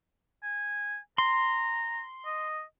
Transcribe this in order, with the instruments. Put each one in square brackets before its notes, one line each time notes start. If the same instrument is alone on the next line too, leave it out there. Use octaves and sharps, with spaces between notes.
[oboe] G#5
[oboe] A#5 [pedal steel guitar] C6
[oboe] D#5